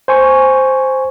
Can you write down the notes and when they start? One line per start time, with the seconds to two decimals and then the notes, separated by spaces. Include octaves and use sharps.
0.08 C5 G#5 C#6